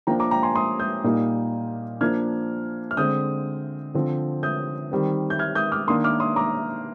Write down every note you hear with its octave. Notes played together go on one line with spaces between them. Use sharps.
F3 A#3 D4 G5 A#5
A#5 D6
G5 A#5
G#5 C6
C6 D#6
D#6 G6
A#2 G3 A#3 D#4
F3 A#3 D4 F6 G#6
F6
D3 G#3 C4 D#6 G6
D3 F3 C4
D#6 G6
D#3 G3 C4
G6
F6 G#6
D#6 G6
D6 F6
D#3 A#3 D4 C6 D#6
D6 F6
C6 D#6
A#5 D6